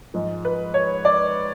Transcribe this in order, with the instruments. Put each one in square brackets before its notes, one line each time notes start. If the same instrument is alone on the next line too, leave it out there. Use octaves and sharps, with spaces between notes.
[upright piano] G#2 F3 G#3
B4
C#5
D5